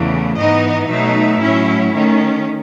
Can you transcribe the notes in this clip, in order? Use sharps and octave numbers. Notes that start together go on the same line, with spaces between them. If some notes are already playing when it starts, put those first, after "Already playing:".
Already playing: E2 C#3 E3 A3
G#2 E3 B3 D#4 D#5
B2 F#3 A3 D#4 E5
A2 F#3 C#4 E4
D#3 A3 C#4